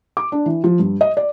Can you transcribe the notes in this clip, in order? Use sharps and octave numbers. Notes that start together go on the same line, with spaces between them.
D6
D4
E3
F3
G2
D#5
D5